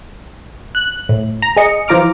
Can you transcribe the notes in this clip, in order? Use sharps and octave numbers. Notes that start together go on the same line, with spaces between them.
F#6
A2
A#5
G#4 D#5 C#7
E3 F3 F4 A#5 D6 F6